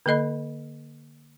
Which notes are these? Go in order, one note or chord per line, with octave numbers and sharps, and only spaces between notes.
D3 A#3 A4 D#5 B5